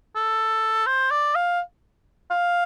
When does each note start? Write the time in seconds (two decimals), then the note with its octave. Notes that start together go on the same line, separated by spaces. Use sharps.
0.16 A4
0.87 C5
1.11 D5
1.35 F5
2.31 F5